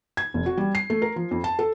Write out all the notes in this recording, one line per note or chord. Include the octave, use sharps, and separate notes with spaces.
G#6
F1
F#4
G3
C7
A3
A#4
F3
F2
A5
A4